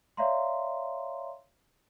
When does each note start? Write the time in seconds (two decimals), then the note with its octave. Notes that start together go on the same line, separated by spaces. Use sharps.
0.17 C#5 D5 E5 F5 A#5 C6